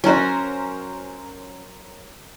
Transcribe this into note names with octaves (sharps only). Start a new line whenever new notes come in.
F#3 C#4 F#4 A#4 C5